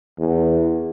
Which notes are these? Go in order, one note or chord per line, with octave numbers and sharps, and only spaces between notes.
E2